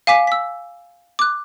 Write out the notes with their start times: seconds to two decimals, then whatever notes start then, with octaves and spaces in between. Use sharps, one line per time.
0.07 F5 G#5 D6 B6
0.27 E6 B6
1.19 D6 F#6